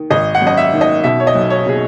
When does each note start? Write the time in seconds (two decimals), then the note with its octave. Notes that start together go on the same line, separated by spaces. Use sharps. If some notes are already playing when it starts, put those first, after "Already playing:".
Already playing: D#3
0.10 G#1 D#5
0.35 F#5
0.42 F#2
0.47 D#5
0.57 E5
0.73 D#3
0.81 D#5
1.04 B2 E5
1.20 C#5
1.27 D#5
1.35 B1
1.50 C#5
1.66 B2 G#4